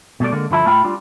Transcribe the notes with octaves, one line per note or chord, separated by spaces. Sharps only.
B2 G3 A3 D5
D3 G#3 A#3
G2 D3 F3 E4 A5
A2 A3 F4 F5 G5 B5
G3 D4 F4